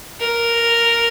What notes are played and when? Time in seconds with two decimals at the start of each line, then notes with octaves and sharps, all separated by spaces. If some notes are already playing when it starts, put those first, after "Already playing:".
0.20 A#4